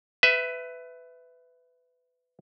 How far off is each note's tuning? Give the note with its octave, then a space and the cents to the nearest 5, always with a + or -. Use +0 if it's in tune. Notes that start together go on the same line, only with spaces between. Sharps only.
B4 +20 E5 +0